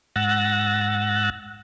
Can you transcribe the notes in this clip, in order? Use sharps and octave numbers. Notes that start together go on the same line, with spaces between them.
G#2 F#5 E6 F#6 A6 A#6